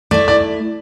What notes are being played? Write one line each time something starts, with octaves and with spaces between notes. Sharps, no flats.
A3 E4 D5
D5